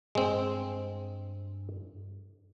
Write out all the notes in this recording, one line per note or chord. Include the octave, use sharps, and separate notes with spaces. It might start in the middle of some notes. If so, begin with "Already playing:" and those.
G2 G#3 C4